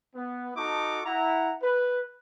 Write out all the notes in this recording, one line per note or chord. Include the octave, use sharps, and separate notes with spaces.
B3
D#4 F#4 A4 A5 C#6 D6
E4 F#5 A#5
B4